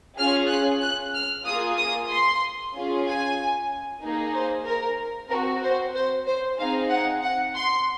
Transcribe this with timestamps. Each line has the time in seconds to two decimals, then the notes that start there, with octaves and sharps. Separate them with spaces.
0.18 C#4 F4 G#4 F6
0.49 F#6
0.81 F#6
1.14 F6
1.46 A#3 F4 G#4 D#6
1.78 D#6
2.09 C6
2.74 C#4 F4 G#4
3.07 G#5
4.02 A#3 D#4 G#4
4.34 C5
4.66 A#4
5.30 C4 A#4
5.35 F#4
5.63 C5
5.94 C5
6.26 C5
6.59 C4 D#4 G#4 F5
6.90 F#5
7.22 F#5
7.55 C6